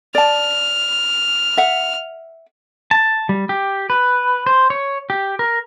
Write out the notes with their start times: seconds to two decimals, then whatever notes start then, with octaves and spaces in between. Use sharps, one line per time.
0.15 D5 A5 F6
1.57 E5 F#5
2.91 A5
3.29 G3
3.49 G4
3.90 B4
4.47 C5
4.70 C#5
5.10 G4
5.39 A#4